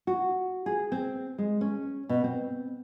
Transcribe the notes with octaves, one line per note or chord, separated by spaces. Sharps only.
F#4
G#4
C4
G#3
C#4
B2
C4